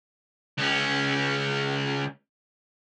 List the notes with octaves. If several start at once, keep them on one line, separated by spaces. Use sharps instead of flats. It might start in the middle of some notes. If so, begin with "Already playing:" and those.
C#2 C#4